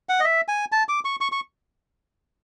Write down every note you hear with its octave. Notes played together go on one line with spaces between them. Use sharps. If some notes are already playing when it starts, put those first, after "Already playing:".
F#5
D#5
E5
G#5
A5
D6
C#6
C#6
C#6